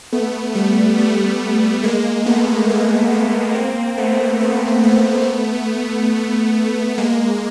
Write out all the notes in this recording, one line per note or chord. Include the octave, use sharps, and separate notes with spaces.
A3 B3
G3 A3
G3 A3
G#3 A#3
A3 B3
G#3 A#3
A3 B3
A#3 C4
A3 B3
A3 B3
A3 B3
G#3 A#3